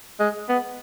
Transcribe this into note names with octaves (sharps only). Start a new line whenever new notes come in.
G#3
B3